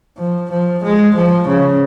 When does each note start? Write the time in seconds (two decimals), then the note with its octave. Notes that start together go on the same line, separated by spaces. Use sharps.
0.18 F3
0.50 F3
0.83 G#3
1.15 F3
1.47 C#3